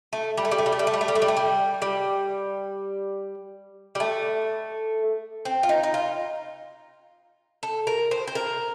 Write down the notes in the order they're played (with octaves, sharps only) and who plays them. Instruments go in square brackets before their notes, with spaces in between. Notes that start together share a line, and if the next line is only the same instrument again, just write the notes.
[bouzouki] A3
G3
A3
G3
A3
G3
A3
G3
A3
G3
A3
G3
A3
G3
A3
G3
G3
G3
A3
C4
F4
D#4
D#4
F4
A4
A#4
C5
C5
A#4